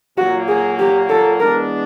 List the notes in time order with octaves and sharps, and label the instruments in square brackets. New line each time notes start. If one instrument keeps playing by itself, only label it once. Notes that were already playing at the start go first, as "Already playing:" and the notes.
[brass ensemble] A#2 F#3 A#3 [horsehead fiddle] F#4
[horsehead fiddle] G#4
G4
A4
[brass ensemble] E3 G#3 B3 D4 [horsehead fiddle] A#4